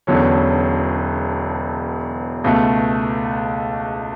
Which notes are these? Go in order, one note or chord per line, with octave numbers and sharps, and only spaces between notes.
E1 E2 D3 F#3 C#4
C#2 B2 A3